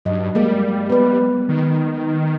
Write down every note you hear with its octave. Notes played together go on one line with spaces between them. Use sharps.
G2 F#3 D#5
G3 G#3 A#3
B3 B4
D#3